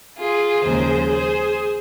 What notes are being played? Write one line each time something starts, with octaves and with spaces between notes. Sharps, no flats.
F4 G#4
D#2 C#3 F3 G#3 G#4 C5
G#4 C5